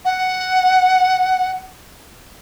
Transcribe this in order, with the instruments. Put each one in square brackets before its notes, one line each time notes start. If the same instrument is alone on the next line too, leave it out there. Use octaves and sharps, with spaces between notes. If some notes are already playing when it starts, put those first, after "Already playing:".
[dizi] F#5